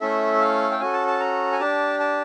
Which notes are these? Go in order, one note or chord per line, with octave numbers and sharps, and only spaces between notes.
A3 C#4 E4 A4 E5
F5
G5
C#4 F#4 A4 G#5
A5
A5
A#5
G#5
D4 G4 A5
A5